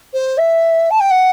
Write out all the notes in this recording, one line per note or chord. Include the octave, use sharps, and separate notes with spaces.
C5
E5
A5
G5
F#5